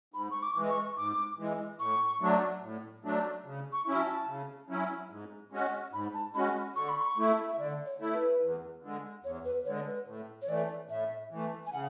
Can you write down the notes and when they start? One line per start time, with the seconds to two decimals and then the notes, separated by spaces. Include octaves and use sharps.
0.14 G#2 B5
0.31 C#6
0.43 D6
0.56 E3 G#3
0.70 C#6
0.97 G#2 D6
1.39 E3 G#3
1.80 A2 C#6
2.21 F#3 A3 D4
2.63 A2
3.04 F#3 A3 D4
3.45 C#3
3.73 C#6
3.87 F#3 C#4 E4
4.00 A5
4.27 C#3
4.69 F#3 C#4 E4
5.10 G#2
5.52 G#3 C#4 F#4
5.93 G#2 B5
6.14 A5
6.34 G#3 C#4 F#4 B5
6.76 D3 C#6
6.89 B5
7.01 C#6
7.17 A3 E4
7.48 E5
7.59 D3 D5
7.86 C#5
8.00 A3 E4
8.14 B4
8.42 E2
8.83 D3 G#3
9.24 E2 C#5
9.45 B4
9.65 D3 G#3 C#5
9.87 B4
10.07 A2
10.42 C#5
10.48 E3 A3 D5
10.89 A2 E5
11.31 E3
11.36 A3
11.66 G#5
11.73 C#3 F#5